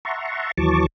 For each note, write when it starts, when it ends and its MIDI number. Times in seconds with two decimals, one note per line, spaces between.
0.05 0.51 76
0.05 0.51 78
0.05 0.51 81
0.05 0.51 82
0.05 0.51 84
0.05 0.51 85
0.58 0.86 39
0.58 0.86 52
0.58 0.86 54
0.58 0.86 81
0.58 0.86 85
0.58 0.86 86